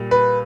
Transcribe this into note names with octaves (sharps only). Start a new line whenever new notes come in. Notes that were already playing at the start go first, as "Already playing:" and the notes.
Already playing: A#2 G3
B4